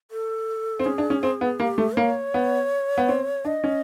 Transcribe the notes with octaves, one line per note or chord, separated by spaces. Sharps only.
A4
C4
C#4 G#4
D4
C#4
C4
B3
A#3 G4
A3
A#3 C#5
B3
B3
C4
D4 D#5
C#4